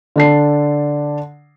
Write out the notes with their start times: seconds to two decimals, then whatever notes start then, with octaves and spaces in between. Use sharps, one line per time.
0.16 D3 D4 C7